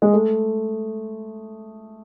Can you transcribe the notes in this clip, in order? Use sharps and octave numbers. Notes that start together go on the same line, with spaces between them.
G#3
A3